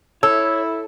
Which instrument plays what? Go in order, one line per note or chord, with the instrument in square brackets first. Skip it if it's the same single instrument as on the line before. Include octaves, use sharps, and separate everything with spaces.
[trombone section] E4 [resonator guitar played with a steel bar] A4 [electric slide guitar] C#5 [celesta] E6